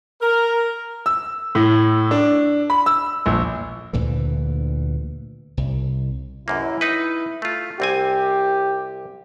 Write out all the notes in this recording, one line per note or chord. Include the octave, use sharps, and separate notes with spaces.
A#4
E6
A2
D4
B5
E6
A#1
D2 A#2 D3 E3
C2
A1 F#2 A#3 E4
D#4 B4
A3 F4
C2 C4 G4 G#5